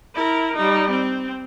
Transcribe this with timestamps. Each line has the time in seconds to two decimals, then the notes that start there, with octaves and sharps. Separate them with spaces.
0.15 E4 A#4
0.56 G3 D#4
0.91 C4